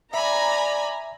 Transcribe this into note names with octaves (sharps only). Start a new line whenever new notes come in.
D5 E5 G#5 A#5 B5